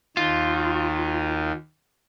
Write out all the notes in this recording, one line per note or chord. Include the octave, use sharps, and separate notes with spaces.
D#2 D#3 F4